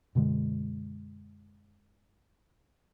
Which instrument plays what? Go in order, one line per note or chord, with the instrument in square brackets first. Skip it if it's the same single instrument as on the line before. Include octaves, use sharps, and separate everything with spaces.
[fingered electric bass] F#2 B2 D3 G#3